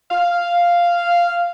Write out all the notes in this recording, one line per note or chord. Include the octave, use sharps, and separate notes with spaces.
F5